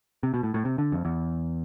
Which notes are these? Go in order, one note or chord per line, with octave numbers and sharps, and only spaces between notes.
C3
B2
A2
A2
C3
D3
F2
E2